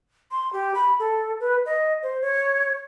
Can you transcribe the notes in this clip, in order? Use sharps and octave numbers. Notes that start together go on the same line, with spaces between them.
C6
G4
B5
A4
B4
D#5
C5
C#5